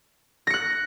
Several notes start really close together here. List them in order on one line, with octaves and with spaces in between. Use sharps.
A#6 C#7 F#6